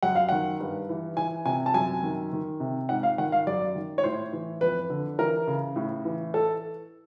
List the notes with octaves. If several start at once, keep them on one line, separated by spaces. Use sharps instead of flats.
F#2 F#5
F5
D#3 F#5
G2
E3
E3 G#5
C3 G#5
A5
F#2 G#5
D#3
D#3
C3
G#2 F#5
F5
D#3 F#5
F5
F#2 D5
D#3
C#5
A2 C5
E3
F2 B4
D3
E3 A#4
C#3
A2
E3
A4